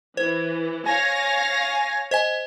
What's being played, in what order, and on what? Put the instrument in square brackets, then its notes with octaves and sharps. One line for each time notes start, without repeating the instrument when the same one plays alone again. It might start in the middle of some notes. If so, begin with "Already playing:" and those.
[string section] E3 [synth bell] C5
[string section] C#5 F5 A#6 [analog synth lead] G#5
[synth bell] C5 D#5 G#5